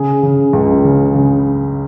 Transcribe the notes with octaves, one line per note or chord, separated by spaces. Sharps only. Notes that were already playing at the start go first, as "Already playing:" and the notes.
Already playing: C#3 G#4
C#3
C#2
C#3
C#3